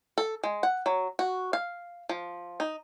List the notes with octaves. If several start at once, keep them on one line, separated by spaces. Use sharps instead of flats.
A4
G#3
F#5
F#3
F#4
F5
F3
D#4